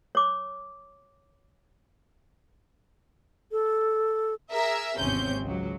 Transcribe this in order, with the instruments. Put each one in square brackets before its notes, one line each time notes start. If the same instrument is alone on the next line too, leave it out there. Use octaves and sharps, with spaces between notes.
[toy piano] C#5 D6
[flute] A4
[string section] G#4 A#4 E5
G#1 E2 C3 C4 C#4 G6
C#2 F#3